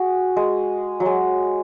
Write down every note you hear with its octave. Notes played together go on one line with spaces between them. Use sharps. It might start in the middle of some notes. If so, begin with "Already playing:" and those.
Already playing: F#4 G#4
G#3
F#3
G#3